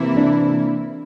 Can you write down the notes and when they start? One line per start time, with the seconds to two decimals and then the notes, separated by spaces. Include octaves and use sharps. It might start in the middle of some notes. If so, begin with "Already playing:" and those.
Already playing: C3 E3 A#3 E4
0.16 D4